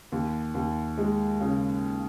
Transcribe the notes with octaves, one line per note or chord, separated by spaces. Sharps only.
D#2
D#2
G#3
C#3